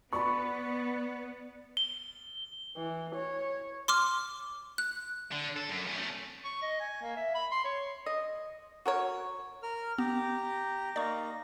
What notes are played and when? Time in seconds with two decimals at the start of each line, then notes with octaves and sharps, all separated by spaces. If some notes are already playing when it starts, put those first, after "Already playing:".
0.13 B3 D5 B5 C#6
1.77 G7
2.77 E3
3.15 C#5
3.88 C6 D6 F6
4.78 F#6
5.32 D3
5.57 A4
5.69 F#2
5.87 E2 C#4
5.98 A3 C#4
6.44 C#6
6.62 D#5
6.80 G#5
7.02 A#3
7.17 E5
7.35 B5
7.52 C6
7.64 C#5
8.06 D#5
8.86 F#4 A#4 C#5
9.63 A#4 F6
9.98 B3 G4 A#5
10.96 A#3 D#4 D5 A#5 C#6